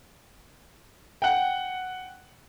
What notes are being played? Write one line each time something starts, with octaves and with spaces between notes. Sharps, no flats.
F#5 G5